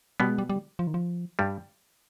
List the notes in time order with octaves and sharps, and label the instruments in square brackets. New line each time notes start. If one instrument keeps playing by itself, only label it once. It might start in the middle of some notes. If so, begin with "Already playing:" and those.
[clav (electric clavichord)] B2 B3 [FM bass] G3
[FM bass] G#3
G3
G3
F3
D#3
F3
[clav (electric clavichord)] G2 G3